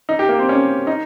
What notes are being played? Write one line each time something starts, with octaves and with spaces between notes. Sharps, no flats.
D#4
G4
A#3
C4
C#4
D#4